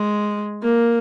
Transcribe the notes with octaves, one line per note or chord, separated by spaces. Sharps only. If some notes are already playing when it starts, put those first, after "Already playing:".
Already playing: G#3
A#3